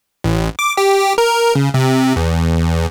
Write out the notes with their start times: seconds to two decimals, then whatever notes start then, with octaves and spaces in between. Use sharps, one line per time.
0.24 A1
0.59 D6
0.77 G4
1.18 A#4
1.55 C#3
1.74 C3
2.16 E2